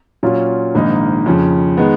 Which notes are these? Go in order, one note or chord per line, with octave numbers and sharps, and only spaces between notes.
A#2 F#3 C#4 F4
A#1 G#2 D#3 A#3 D#4
F2 C#3 F3
D#3 G#3 B3